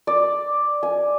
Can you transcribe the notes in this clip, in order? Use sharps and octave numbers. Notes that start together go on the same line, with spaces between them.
D5
G#5